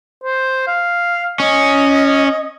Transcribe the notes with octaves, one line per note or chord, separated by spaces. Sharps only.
C5
F5
C#4 D#5